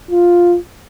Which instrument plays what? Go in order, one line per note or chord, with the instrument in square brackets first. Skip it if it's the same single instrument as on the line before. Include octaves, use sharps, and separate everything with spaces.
[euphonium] F4